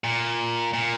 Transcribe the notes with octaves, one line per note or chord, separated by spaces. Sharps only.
A#2
A#2